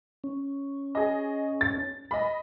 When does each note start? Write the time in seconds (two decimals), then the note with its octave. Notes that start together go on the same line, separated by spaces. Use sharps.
0.24 C#4
0.95 G#4 D#5
1.61 A6
2.11 D#5 B5